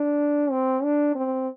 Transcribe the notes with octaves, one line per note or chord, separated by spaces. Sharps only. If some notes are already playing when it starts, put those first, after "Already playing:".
Already playing: D4
C4
D4
C4